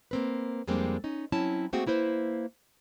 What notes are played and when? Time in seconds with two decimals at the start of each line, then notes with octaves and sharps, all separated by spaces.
0.11 A#3 C4 B4
0.67 F2 G3 G#3 A#3 C4 D4
1.04 C#4 D#4
1.32 F#3 C4 C#4 E4 A5
1.73 A3 A#3 C4 F#4 G#4 G5
1.87 A#3 E4 B4 C5